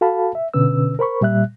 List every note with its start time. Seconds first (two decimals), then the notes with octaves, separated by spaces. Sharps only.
0.01 F#4 A4 F5 A5 B5
0.35 E5
0.54 B2 D3 C#4 B4 E6
0.99 A#4 C5 B5 C#6
1.21 A#2 G3 E5 F#6